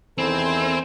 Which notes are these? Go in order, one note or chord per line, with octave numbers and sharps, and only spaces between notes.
E2 D#3 C4 E4 A4 C5 G#5